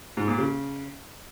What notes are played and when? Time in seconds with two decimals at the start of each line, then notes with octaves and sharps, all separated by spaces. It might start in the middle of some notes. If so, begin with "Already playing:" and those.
0.17 G#2
0.28 A#2
0.38 C#3